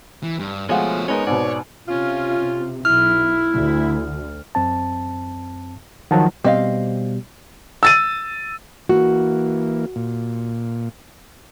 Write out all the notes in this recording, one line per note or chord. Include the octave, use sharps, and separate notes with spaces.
E3
G2
B2 F3 G#3 A3 F4 C#5 F5 F#5
G#3 B3 C#4 D#4 A#4 C#5
G#2 B2 D5
C3 C#4 F4
B1 E4 F6
D2
F#2 C4 A5
D#3 F3 F#3 F#5 A5
B2 G3 C4 D#5 F5
E6 A6 D#7
E3 A#3 F#4
A#2